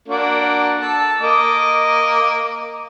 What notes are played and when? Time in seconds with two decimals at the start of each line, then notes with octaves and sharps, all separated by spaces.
0.08 A#3 D4 F#4
0.81 A4 A5
1.20 A#3 D#5 D6